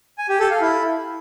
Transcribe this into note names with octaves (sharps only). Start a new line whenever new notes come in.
G#5
G4
A4
F5
E4